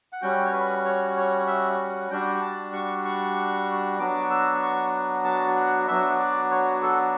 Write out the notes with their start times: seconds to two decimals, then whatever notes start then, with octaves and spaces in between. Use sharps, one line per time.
0.13 F#5
0.22 G3 C#4 F#4 G5
0.45 C#5
0.53 B4
0.85 C#5
1.17 C#5
1.47 E5
1.78 F#5
2.11 G3 D4 F#4 G5
2.41 A5
2.73 C#6
3.05 C#6
3.99 F#3 B3 D4 F#4 D6
4.30 E6
4.63 C#6
5.24 A5
5.56 F#5
5.87 F#3 B3 D4 F#4 E5
6.19 D5
6.51 C#5
6.82 A4